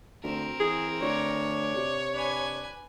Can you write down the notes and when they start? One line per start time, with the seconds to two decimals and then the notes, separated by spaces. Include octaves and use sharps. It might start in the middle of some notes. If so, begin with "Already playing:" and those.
0.23 D2 C4 A#4
0.60 E3 G#4
1.02 D2 D4 C#5
1.76 C3
2.14 D4 B4 G#5